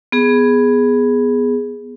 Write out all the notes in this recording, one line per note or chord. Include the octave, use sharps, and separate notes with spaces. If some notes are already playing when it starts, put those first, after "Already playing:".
B3 G#4